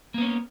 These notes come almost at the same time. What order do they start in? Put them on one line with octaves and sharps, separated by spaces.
A#3 B3 C#4